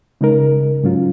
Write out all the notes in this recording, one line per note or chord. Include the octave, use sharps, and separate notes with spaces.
C#3 G#3 D#4 A#4
G#2 F#3 C#4 F4